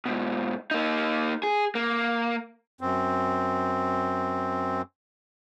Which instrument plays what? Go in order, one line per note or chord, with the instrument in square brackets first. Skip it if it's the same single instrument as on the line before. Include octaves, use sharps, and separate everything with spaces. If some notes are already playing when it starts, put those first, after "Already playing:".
[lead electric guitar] G#2 B2
A#3 D#4
G#4
A#3
[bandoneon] F#2 C4